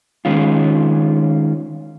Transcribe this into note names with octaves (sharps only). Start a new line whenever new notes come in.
D#3 G#3 C#4 F4